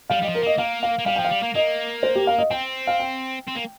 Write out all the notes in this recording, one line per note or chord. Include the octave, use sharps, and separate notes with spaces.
G3 F5
G3 D#5
F3
A#4
A#3 D#5
A#3 F5
F5
A#3
G3 F5
F3 G5
F5
G3
A#3
A#3 D#5
C5
G4
F5
D#5
C4 G5
F5
G5
C4
A#3